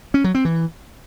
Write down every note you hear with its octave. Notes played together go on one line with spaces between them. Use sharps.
C#4
F#3
C4
E3